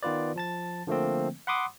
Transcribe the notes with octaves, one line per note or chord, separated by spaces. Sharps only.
D#3 B3 F4 B4 D5
F3 A5 A6
D3 F3 A3 A#3 C4
F#5 B5 C6 D6 D#6